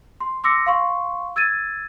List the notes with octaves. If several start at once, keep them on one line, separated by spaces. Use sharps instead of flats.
C6
C6 D6 E6 A#6 C#7
F5 C6 C#6
E6 G#6 A6 D#7